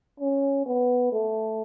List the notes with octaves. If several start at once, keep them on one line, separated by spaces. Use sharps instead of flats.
C#4
B3
A3